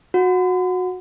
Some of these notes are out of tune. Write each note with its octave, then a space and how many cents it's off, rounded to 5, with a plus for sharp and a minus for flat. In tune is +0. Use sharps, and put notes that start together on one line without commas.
F#4 -20